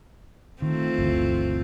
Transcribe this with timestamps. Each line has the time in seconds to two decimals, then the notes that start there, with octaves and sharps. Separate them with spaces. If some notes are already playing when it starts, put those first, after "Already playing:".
0.62 D#3 A3 C4 F4
0.98 G1 D2 E3